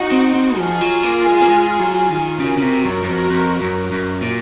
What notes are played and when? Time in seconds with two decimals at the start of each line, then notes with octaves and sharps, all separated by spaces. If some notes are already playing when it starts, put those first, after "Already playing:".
Already playing: D#4 F#4
0.12 C4
0.34 C4
0.57 F3 F4 G#4
0.81 F#3
1.03 A#3
1.26 G#3
1.41 A#3
1.49 G#3
1.79 F#3
2.10 D#3
2.39 C#3 F#4 A#4
2.57 C#3
2.62 C3
2.84 F#2
3.03 F#2
3.07 F2
3.30 F2
3.61 F#2
3.91 F#2
4.21 A#2